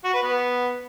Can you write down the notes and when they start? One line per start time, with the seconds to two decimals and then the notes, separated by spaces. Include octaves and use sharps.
0.04 F#4
0.13 B4
0.23 B3